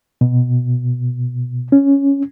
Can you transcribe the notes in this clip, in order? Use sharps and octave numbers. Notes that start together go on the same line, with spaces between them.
B2
C#4